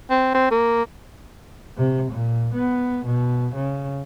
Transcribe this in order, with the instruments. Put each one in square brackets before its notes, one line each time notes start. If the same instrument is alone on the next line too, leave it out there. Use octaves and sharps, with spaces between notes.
[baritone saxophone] C4
C4
A#3
[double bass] C3
A#2
B3
B2
C#3